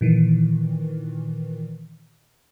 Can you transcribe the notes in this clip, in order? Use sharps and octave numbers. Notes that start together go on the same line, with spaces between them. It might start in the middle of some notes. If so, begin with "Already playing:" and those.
A#2 D#3 E3